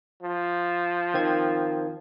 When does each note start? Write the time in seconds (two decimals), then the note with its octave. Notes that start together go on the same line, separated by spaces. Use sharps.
0.23 F3
1.14 D#3 C4 G#6